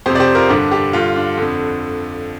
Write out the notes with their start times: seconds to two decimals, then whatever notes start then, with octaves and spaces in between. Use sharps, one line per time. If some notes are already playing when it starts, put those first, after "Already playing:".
0.06 F2 C3 G4 C5
0.15 D5
0.20 G4 C5
0.35 F4 A#4
0.49 G2 D3 D4 G4
0.72 D4 G4
0.93 G2 D3 F4
1.16 D4
1.38 F2 D3